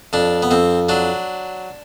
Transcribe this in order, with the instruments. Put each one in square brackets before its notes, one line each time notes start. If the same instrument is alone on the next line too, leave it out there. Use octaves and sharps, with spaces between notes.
[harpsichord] F2 D4
B3
F2 C4
F#3 D4